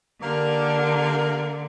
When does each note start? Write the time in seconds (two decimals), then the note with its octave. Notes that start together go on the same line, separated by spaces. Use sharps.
0.22 D3 A#3 G4 A#4